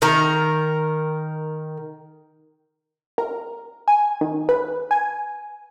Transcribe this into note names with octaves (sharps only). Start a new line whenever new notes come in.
D#3 A#4
A#4
G#5
D#3
B4
G#5